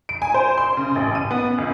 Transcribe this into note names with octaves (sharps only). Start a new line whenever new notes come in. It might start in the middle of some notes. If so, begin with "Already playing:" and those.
D7
G#5
C5
C6
C#3
A1
D#7
B3
C#2